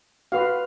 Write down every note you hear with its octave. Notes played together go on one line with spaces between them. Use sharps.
F#4 B4 F5